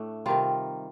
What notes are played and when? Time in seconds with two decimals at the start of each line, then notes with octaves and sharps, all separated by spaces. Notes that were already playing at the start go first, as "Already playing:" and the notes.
Already playing: A2 A3 D4
0.26 C3 D#3 G3 F4